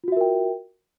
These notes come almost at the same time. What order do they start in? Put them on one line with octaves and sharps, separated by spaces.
F4 F#4 E5 A#4 G5